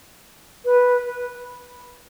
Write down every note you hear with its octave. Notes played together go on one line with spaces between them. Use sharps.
B4